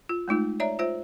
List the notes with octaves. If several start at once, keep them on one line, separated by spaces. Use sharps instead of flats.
F4
G#3 A3 D#4 F4
C#5 D5 E5 A#5
F4 C5 E5